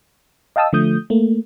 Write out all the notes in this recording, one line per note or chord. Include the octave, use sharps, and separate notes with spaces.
D#5 F5 G5 A5 D#6 E6
D3 F3 A3 D#6 G6
A3 A#3